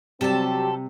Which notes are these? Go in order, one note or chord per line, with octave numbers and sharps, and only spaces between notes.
C3 F#3 G3 C4 G4 A4 A5